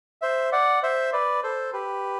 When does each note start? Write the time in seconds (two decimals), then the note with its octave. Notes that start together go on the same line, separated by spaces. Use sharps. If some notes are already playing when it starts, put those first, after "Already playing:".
0.22 C5 E5
0.52 D5 F#5
0.83 C5 E5
1.13 B4 D5
1.43 A4 C5
1.73 G4 B4